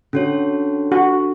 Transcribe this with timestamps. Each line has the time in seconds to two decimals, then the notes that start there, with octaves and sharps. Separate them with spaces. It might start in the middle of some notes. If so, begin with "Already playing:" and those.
0.13 D3 C#4 F#4 C#5
0.92 F#4